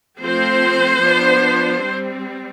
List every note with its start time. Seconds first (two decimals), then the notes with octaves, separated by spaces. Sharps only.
0.21 F3 A3 C4 C5
1.03 F3 B3 D4
1.84 G3 C4